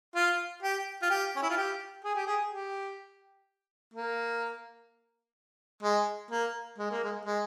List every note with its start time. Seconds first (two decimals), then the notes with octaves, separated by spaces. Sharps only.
0.16 F4
0.63 G4
1.03 F4
1.11 G4
1.37 C#4
1.43 E4
1.50 F4
1.58 G4
2.05 G#4
2.16 G4
2.28 G#4
2.52 G4
3.94 A#3
5.83 G#3
6.31 A#3
6.78 G#3
6.91 A#3
7.04 G#3
7.26 G#3